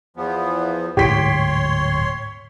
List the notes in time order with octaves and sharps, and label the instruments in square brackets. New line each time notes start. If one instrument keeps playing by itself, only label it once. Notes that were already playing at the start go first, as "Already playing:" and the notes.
[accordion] E2 F3 B3
[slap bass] D1 G#2 [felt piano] G4 B6 D7 [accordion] C#5 C6